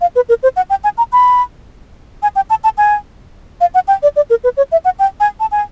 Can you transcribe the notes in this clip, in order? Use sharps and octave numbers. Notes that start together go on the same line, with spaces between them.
F5
B4
A#4
C5
F#5
G5
G#5
A#5
B5
G#5
G5
A5
A5
G#5
F5
F#5
G5
D5
D5
A#4
B4
C#5
E5
F#5
G5
G#5
A5
G#5